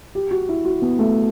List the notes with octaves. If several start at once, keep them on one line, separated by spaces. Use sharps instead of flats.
G4
F#4
E4
F#4
B3
A3